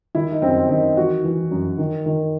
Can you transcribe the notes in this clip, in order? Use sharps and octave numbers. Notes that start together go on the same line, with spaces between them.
D#3 E4
D#4
F#2 C4
C4
D#3 D#4
E3 F#4
E3
F#2
D#3
D#3